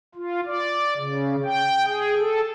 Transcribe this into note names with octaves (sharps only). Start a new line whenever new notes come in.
F4
D5
C#3
G5
G#4
A4